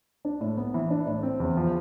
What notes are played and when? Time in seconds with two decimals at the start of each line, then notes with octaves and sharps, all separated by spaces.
0.25 D4
0.41 A2
0.57 B3
0.74 E3
0.90 D4
1.06 A2
1.23 C4
1.40 E2
1.57 F3